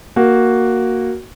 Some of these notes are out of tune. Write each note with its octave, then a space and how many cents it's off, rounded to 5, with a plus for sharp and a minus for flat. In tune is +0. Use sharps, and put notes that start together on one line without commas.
A#3 +0 F#4 +0